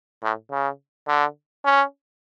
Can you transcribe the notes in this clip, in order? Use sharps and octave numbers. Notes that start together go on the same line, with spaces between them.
A2
C#3
D3
C#4